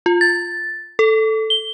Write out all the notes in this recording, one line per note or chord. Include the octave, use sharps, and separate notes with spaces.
F4
A6
A4
G7